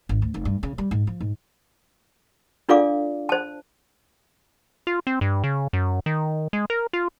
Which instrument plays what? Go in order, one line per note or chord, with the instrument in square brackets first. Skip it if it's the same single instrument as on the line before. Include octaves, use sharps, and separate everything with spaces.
[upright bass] G#1
D2
F1
G2
C#3
G3
G#2
F3
G#2
[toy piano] D4 F4 A4 D5 F5 D6
C5 A5
[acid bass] F4
C4
G2
C#3
F#2
D#3
G#3
A#4
F4